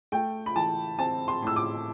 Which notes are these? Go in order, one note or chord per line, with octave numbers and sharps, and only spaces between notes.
A3 G5
B5
E3 A5
C4 A5
C6
A2 E6
D6